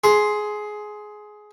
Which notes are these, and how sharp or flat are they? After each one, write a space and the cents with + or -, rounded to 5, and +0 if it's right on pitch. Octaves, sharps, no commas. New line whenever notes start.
G#4 +15 C6 +0